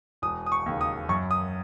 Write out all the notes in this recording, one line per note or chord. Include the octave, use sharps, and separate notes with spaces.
E1 D#6
D#6
C#6
D#2 C#3
D#6
F#2 C#6
D#6